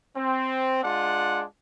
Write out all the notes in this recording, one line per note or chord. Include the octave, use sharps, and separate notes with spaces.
C4
G#3 D4 F4 F#5